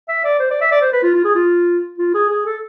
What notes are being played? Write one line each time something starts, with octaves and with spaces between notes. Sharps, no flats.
E5
D5
C5
D5
E5
D5
C5
B4
F4
F4
G#4
F4
F4
G#4
G#4
A4